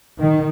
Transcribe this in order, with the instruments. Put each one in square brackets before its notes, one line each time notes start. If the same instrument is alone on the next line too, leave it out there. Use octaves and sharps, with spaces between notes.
[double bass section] D#3